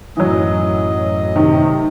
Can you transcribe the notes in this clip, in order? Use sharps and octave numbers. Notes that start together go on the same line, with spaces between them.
F#2 A2 E3 F#3 D#5
C3 D#3